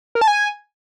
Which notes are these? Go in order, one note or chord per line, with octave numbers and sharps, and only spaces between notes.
A#4
A5
G#5